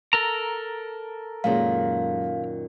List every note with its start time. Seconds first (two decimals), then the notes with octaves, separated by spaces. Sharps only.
0.13 A4 A#4 A#5
1.44 F#1 F#2 A#2 D#3 G#3 G#4 F5